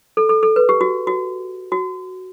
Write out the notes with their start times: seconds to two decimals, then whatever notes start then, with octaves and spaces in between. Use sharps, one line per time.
0.17 A4
0.29 A4
0.43 A4
0.56 B4
0.69 G4
0.81 F#4
1.07 F#4
1.72 F#4